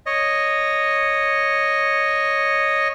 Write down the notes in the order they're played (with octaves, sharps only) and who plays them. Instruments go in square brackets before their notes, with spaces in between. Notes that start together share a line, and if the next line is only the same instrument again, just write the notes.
[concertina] C#5 D#5